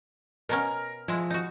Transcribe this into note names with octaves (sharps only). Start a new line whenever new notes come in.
B2 B3 C#4 A#4 A#5 F6
F3 G#3 E4
D#4 F#4